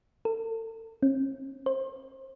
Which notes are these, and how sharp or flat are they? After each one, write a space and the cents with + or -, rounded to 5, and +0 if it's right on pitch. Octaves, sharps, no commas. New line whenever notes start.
A4 +35
C#4 -45
C5 +25